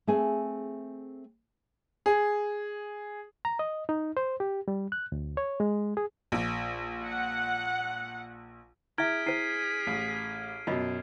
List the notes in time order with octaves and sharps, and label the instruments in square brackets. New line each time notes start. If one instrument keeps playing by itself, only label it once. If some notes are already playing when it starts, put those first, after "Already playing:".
[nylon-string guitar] A3 C4 G#4 G#5
[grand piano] G#4
[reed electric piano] A#5
D#5
D#4
C5
G4
G3
F#6
D2
C#5
G#3
G#4
[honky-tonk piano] A#1
[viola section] F#5
[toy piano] E4 E5 [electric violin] G#4 B6 [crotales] F6 G#6 D7
[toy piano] E4 C5 [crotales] C7 D#7
[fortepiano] A1
[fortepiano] F#2 B2 [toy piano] F4 D#5